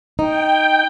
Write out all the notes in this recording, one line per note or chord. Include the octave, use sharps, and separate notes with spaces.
D#4 G5